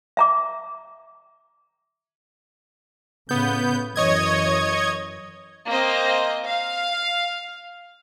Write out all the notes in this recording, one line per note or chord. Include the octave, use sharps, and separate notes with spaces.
E5 A#5 D6
A2 C#3 B3 G6
F#2 E3 C#5 D#5 G#6
A#3 C4 C5 D#5
F5